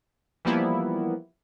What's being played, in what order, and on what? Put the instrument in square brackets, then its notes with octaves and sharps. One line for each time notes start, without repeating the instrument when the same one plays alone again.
[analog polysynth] E3 F3 G3 A#3 B3 E4